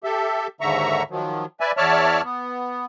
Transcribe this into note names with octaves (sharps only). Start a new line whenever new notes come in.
G4 A4 E5
D#2 G#2 D3 E5 A#5 C#6
D#3 F3 F#3
B4 D5 E5 G#5
E2 C#5 D5 E5 A5 F6
B3